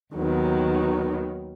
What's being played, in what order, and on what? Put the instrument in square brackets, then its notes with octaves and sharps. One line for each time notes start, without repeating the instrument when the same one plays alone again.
[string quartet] D#2 D#3 F#3 B3